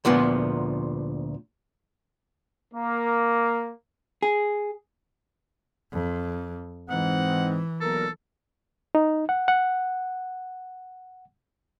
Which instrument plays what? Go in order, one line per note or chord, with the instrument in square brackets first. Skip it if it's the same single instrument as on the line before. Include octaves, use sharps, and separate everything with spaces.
[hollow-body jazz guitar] D2 A#2 F3 B3
[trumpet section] A#3
[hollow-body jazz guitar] G#4
[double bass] F2
[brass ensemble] G#2 C4 D#4 [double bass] E3 [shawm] F#5
[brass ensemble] B1 A#2 A#4 [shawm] A4
[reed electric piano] D#4
F#5
F#5